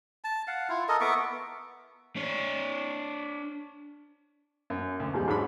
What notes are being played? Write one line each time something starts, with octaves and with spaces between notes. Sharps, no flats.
A5
F5 F#5
E4 F4
A4 A#4 D#5
B3 E5 C#6 D6
D4 C#5
F#2
D2
E2 G#2 C#3 G3 D#4
G#2 F#3 G#3 D4 B5